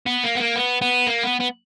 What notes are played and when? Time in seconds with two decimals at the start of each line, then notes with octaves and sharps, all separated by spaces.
0.06 B3
0.23 A#3
0.35 B3
0.40 A#3
0.56 B3
0.82 B3
1.07 A#3
1.24 B3
1.40 B3